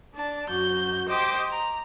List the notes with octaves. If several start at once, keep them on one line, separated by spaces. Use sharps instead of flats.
D4 A5
F#2 F#4 G6
G4 C5 D#5 D6
A#5